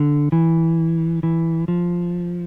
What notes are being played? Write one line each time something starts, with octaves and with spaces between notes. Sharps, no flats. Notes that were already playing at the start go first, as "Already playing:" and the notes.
Already playing: D3
E3
E3
F3